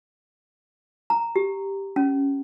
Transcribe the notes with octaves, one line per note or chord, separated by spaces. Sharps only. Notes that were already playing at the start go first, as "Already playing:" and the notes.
A#5
G4
C#4